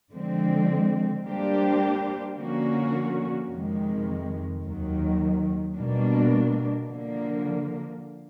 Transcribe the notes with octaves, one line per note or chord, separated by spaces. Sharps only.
D3 F3 G#3 C4
G3 A#3 D4 G4 C5
D3 F3 A#3 C#4 F#4
F2 C3 D#3 G#3
D#2 D#3 F#3
B2 G3 A#3 D4
D3 F3 A#3